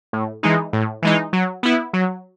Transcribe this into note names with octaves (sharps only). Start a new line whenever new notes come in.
A2
E3 G#3 D#4
A2
E3 G#3 D#4
F#3
B3 E4
F#3